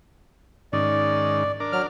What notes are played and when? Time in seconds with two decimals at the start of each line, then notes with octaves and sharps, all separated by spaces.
0.73 G#2 D#3 C#4 D5
1.60 D4 A#4 D5
1.72 F#3 F6